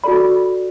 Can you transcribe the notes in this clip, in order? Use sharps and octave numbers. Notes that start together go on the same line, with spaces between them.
F#4 A4 D5 B5